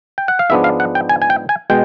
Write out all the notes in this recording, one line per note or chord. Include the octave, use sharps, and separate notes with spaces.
G5
F#5
F5
G#2 F3 G#3 B3 D4 E5
F5
F#5
G5
G#5
G#5
G5
G#5
B2 G#3 G5